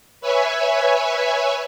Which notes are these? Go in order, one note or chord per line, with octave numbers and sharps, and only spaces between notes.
B4 C#5 E5 G#5